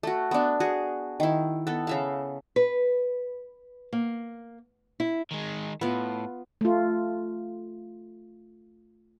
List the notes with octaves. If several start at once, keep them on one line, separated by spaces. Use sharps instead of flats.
A3 F#4
B3 D4
F#4 G#4
D#3 E4
B3 A4
C#3 E5 F5
B4
A#3
E4
D#3 G#3
A2 B3 F4
A3 F4